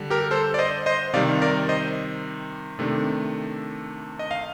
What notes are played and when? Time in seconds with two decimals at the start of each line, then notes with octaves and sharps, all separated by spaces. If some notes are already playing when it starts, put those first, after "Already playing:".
Already playing: D3 G3 D4
0.10 G4 A#4
0.31 A4 C5
0.54 D5
0.59 C5 D#5
0.86 C5 D#5
1.13 C3 D#3 G3 D5 F5
1.42 A#4 D5
1.69 C5 D#5
2.79 C3 D#3 A3 D4
4.19 D#5
4.31 F5